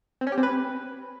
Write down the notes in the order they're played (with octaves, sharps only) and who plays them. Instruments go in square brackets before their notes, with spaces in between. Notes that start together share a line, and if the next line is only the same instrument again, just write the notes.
[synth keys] C4
C#4
G4
C4
B4